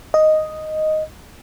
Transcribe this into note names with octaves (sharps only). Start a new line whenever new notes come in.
D#5